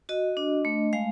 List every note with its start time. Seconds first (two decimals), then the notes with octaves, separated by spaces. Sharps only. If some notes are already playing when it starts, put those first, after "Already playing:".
0.09 F#4 D#5
0.37 D4
0.65 A3
0.93 G#3 F5